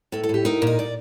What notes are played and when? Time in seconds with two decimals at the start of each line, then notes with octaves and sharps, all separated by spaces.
0.12 A2 A4
0.23 A4
0.29 A2 G4
0.45 D#4 A#4
0.62 A#2 D#5
0.79 D5